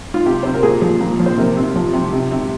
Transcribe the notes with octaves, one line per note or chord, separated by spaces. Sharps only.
F4
C3 G4
C3 C5
A#4
A#2 G#4
F3
A#2
F3
C5
C3 A#4
C3
F3
C3
C3
C3